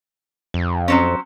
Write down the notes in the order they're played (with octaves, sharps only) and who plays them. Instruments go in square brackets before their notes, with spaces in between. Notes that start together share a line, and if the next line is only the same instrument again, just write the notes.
[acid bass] F2
[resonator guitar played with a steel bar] F#3 C4 C#4